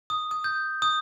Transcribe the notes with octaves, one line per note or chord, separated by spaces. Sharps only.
D#6
D#6
G6
D#6